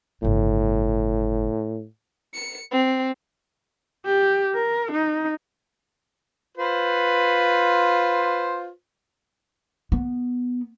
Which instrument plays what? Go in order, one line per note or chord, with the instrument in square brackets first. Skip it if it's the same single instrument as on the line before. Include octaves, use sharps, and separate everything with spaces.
[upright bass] G1 C#3 [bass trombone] A2
[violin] C#7
C4
[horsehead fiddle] G4
A#4
D#4
[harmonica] F4 B4 C5
[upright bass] B3